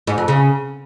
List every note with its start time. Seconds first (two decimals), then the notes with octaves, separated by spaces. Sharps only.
0.07 G#2
0.18 F2
0.28 C#3